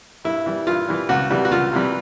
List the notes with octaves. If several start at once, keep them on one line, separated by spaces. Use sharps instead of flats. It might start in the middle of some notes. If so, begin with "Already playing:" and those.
G2 E4
E3 G3
G2 F4
E3 G3
C#2 F#4
C3 E3 G3
F#4
C#2 F4
C3 E3 G3